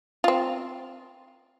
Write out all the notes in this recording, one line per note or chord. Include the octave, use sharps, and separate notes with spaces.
C4 F4